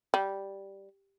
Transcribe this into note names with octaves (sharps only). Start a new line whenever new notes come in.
G3